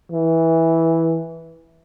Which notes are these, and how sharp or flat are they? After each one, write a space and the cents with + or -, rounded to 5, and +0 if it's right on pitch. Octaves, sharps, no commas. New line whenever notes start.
E3 -10